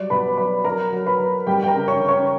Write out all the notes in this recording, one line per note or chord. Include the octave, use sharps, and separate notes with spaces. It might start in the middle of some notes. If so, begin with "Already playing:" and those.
Already playing: F#3 G3 D5 D6
B2 B4 B5
F#3 B4 B5
F#3 A#4 A#5
F#3
B4 B5
F#3
G3 G4 G5
G5
A#4 A#5
C#3
C#5 C#6
C#3
C#5 C#6